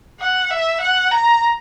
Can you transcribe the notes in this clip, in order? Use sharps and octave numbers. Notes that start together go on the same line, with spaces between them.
F#5
E5
F#5
A#5